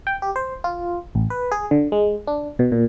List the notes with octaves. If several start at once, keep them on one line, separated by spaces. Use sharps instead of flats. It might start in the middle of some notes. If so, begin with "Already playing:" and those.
G5
G4
C5
F4
A1
B4
G#4
D3
G#3
D4
B2
A#2